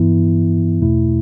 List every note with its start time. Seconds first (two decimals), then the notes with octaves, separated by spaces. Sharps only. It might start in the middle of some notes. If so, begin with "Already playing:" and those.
Already playing: G2 E3 B3 E4
0.81 E2 B2 A3 E4